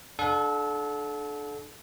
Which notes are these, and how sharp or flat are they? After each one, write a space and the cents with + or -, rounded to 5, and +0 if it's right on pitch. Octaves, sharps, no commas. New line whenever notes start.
D4 +20 A4 -30 F#5 -40